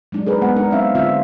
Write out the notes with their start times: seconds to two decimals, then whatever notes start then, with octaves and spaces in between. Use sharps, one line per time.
0.12 F#3 G#3 D4 D#4
0.27 G#4 A#4 B4
0.42 G#3 B3 F#5
0.56 G#3 D4 D#4 A#4
0.71 F#3 C4 D4 E5 F5
0.95 D3 C4 F4 E5 F5